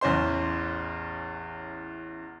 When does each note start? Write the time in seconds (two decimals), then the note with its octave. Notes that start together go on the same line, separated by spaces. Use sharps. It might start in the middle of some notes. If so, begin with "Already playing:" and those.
0.01 A1 E2 C#4 C5 C6